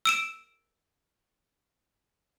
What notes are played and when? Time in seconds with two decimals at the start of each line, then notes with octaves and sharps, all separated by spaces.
0.05 E6 D7 E7